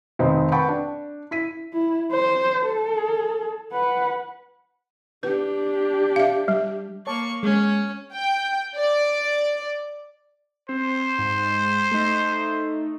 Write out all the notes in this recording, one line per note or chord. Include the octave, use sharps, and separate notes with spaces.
F1 D#3 C4 C5 D#5
B4 F#5 G5 A5 B5 C#6
D4
E4 B6 D#7
E4
C5
A4
B4 F#5
D4 G4 B4
E5 F5
G3
A#3 C#5 A5 C#6 D6
G#3 C#4
G5
D5
C4 C5
G#2
A3 D#4